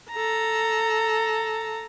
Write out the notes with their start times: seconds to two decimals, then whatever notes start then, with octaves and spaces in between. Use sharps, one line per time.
0.11 A4 A#5